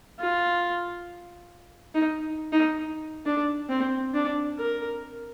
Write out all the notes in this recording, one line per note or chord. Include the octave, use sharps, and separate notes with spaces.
F4
D#4
D#4
D4
C4
D4
A#4